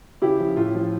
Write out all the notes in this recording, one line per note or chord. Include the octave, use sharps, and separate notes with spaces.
C#3 E4 G4
F3
A2 F4
F3